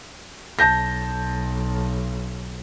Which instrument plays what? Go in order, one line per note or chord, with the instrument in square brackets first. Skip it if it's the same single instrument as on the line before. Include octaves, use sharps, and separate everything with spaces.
[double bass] B1 [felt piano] A5 G6 A#6